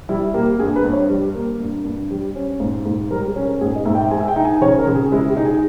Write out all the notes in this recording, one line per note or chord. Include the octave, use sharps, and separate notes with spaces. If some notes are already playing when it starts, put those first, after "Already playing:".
G3 E4
A#3 G4
G2 G#4
B4
G2
C#5
G3
A#3
G2
G2
G3
C#4
G#2
G#2
G3 A#4
G#4
C#4
A#4
G#2 G#4
D#5
G#2 E5
G5
G#3 G#5
E5
G5
D#4
G#5
C#3 C#5
A#4
C#3
G#4
G#3 E4
G4
D#4
G#4